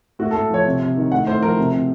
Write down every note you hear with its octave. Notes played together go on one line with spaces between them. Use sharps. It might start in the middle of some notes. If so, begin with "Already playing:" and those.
A2 F#4
A4
A2
F3 C#5
C3
C3
D#3
A2 F#5
A2 C5
F3 A#4
C3
C3